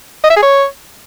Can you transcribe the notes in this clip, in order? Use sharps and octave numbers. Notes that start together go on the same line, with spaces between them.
D#5
E5
G#4
C#5